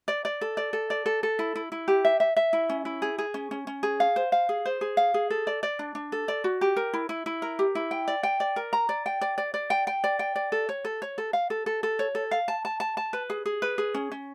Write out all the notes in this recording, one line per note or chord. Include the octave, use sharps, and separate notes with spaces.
D5
D5
A4
D5
A4
D5
A4
A4
E4
E4
E4
G4
E5
E5
E5
E4
C#4
E4
G#4
G#4
C#4
C#4
C#4
G#4
F5
C5
F5
G#4
C5
G#4
F5
G#4
A4
D5
D5
D4
D4
A4
D5
F#4
G4
A#4
E4
E4
E4
A#4
G4
E4
G5
D5
G5
D5
A#4
A#5
D5
G5
D5
D5
D5
G5
G5
D5
G5
D5
A4
C#5
A4
C#5
A4
F5
A4
A4
A4
C#5
A4
F5
A5
A5
A5
A5
B4
G#4
G#4
B4
G#4
C#4
C#4